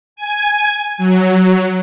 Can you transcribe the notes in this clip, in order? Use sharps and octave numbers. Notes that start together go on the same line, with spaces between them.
G#5
F#3